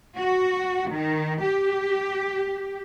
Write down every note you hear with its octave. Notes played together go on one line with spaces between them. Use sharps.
F#4
D#3
G4